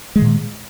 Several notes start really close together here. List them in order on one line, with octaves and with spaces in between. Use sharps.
G#3 D#3 A#2